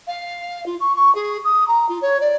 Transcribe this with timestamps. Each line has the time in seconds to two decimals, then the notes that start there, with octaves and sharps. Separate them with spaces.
0.07 F5
0.66 F4
0.80 C#6
0.95 C#6
1.15 G#4
1.44 D#6
1.67 A#5
1.89 F4
2.01 C#5
2.21 D5